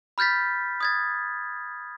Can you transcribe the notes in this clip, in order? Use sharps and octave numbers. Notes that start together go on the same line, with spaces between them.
B5 F6 G6 A6 B6
D#6 G#6 A6